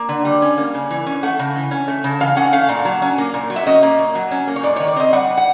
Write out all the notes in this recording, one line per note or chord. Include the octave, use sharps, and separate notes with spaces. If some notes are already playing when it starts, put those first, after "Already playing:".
Already playing: A#3
D3
G3
C#4
A#3
C#3
E3
C#4
A3 F#5
C#3
E3
C#4
A3
C#3
E3 F5
C#4 F#5
A3 F5
A#2
F#3
C#4
A#3
A#2
F#3
E5
C#4 D#5
A#3
A#2
F#3
C#4
A#3
C#5
G#2 D5
D#3 C#5
D5
C4 D#5
G3 F#5
F#5